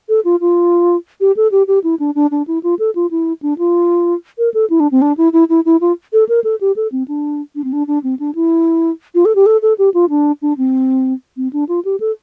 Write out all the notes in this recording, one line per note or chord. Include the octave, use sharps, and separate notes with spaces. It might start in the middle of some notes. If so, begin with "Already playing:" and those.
A4
F4
F4
G4
A4
G4
G4
E4
D4
D4
D4
E4
F4
A4
F4
E4
D4
F4
A#4
A4
E4
D4
C4
D4
E4
E4
E4
E4
F4
A4
A#4
A4
G4
A4
C4
D4
D4
C4
D4
D4
C4
D4
E4
F4
A4
G4
A4
A4
G4
F4
D4
D4
C4
C4
D4
F4
G4
A4